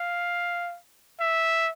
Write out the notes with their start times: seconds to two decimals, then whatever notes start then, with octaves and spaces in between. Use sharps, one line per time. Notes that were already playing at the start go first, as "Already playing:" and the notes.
Already playing: F5
1.20 E5